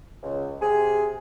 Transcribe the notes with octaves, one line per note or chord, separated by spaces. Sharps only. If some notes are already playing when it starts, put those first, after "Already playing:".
C#2
C3 C4 G#4